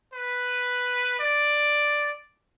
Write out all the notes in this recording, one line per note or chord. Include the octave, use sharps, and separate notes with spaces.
B4
D5